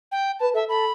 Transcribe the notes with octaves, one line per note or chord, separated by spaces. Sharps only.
G5
B4 A5
A4 E5
A4 B5